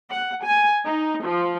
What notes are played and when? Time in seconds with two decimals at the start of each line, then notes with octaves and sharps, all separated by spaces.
0.11 F#5
0.45 G#5
0.85 D#4
1.22 F3